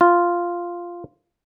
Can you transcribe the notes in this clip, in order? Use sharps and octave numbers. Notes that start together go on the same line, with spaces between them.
F4